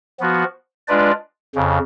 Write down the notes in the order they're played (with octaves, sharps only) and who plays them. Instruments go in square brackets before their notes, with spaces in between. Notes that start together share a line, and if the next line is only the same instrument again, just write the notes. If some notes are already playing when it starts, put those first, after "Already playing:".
[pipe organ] F3 B3 F#4
G#3 D4 F4 B4 D5
F2 C#3